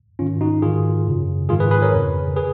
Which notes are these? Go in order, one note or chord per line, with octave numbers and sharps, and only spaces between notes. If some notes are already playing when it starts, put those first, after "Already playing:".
G#2 D#3 C#4 F4
D#4 F#4
G#2 D#3 F4 G#4
F#2 C#3
G#2 D#3 F4 G#4
G#4 B4
G#4 B4
A#4 C#5
F2 C#3
G#4 B4